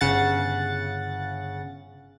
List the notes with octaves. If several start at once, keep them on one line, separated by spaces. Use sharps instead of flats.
G1 C#3 F#5 A6